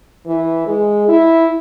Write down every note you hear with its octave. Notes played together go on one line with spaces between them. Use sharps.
E3
G#3
E4